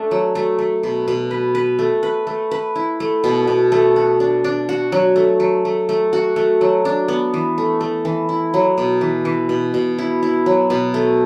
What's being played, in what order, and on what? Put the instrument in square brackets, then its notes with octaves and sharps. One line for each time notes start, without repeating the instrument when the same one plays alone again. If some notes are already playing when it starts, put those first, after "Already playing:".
Already playing: [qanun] A3 D4
F#3
A3
A3
B2
B2
B4
B4
A3
B4
A3
B4
E4
A3
B2
B2
A3
F#4
D4
D4
F#4
F#3
A3
F#3
A3
A3
F#4
A3
F#3
D4
B3
E3
A3
A3
E3
E4
F#3
B2
E3
E3
B2
B2
E4
E4
F#3
B2
A3